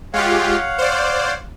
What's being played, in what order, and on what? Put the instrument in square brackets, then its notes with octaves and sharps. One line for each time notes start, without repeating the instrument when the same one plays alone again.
[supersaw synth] G#3 F4 G4 [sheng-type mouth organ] C#5 F5 F#5
[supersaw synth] C5 D5